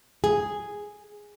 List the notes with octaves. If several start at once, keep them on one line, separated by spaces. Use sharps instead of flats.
G#4